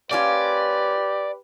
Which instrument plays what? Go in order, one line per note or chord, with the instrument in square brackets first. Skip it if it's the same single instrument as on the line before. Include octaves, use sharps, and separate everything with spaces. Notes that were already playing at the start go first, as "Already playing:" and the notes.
[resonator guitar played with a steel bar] A#3 C#4 F4 [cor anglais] G4 [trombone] B4 [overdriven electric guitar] D5